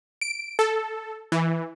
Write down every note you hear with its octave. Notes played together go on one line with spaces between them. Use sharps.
D7
A4
E3